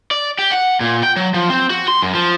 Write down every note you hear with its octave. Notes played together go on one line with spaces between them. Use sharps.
D5
G4
F#5
A#2
G5
F#3
F3
C4
F#4
C6
F#2
F3